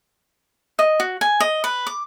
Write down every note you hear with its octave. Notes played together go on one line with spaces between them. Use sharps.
D#5
F#4
G#5
D#5
B4
D6